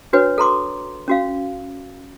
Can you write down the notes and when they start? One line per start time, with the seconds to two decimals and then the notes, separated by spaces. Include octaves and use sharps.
0.13 D4 F#4 B4 C#5
0.38 A4 A#5 C6 D6
1.08 C#4 F#4 F5